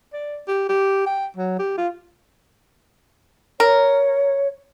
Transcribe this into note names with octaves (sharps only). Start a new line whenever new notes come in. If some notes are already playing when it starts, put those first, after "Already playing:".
D5
G4
G4
G5
F#3
G4
F4
A#4 C#5